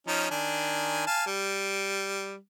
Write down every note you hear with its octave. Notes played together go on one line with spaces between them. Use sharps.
F3 C#4 D#4
D#3 D4 G#5
F5 G#5 A5
G3